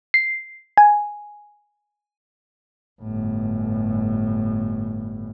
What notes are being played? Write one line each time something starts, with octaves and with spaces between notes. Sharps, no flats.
C7
G#5
G1 A2